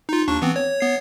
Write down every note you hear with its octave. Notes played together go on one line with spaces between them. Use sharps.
D#4 F4
D#2 D4 C#6
E3 B3 C4
C#5
B3 C#5 C7